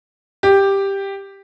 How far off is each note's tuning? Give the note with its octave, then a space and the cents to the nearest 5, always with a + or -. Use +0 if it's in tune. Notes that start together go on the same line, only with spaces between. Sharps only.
G4 +5